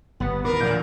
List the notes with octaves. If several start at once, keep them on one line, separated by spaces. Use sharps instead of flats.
G1 G3 B3
D#2 A2 A#4 B5 D6
A#2 D3 E3 F3 G6